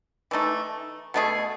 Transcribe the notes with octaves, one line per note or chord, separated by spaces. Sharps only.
E3 A3 D#4
B2 A3 E4 G#4